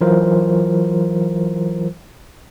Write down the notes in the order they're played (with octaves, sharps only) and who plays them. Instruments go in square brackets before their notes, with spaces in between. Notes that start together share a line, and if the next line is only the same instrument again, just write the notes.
[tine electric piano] E3 F#3 F4 A#4 C5